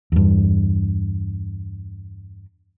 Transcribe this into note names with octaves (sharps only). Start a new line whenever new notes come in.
E2 G2